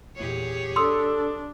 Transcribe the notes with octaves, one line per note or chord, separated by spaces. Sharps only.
E2 A#2 G4 G#4 C#5
D4 A4 C6 D#6 E6